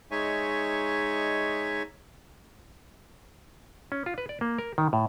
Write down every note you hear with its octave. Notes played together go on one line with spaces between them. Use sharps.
G#3 D#4 C#5 E5 G#5 C#6
C#4
F4
B4
D5
A#3
A#4
D#3
A2